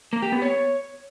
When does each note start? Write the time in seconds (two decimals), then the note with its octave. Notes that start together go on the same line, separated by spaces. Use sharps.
0.13 A#3
0.22 G4
0.32 B3
0.42 C#5